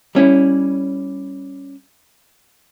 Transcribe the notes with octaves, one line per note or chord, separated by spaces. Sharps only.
G3 C#4 E4